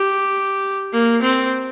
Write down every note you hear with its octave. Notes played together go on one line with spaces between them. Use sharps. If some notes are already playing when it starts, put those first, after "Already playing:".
Already playing: G4
A#3
C4